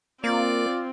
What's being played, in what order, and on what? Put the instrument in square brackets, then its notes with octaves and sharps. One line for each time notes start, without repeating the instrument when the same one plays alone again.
[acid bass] A#3 [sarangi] C4 [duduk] F4 [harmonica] D5